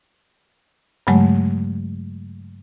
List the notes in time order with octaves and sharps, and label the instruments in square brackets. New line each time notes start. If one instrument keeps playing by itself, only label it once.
[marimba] G2 C#3 F#3 G#3 A3